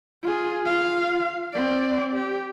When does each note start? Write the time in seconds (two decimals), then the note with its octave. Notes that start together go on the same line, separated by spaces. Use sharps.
0.23 F4 G#4
0.66 F4 F5
1.53 C4 D5
2.14 G4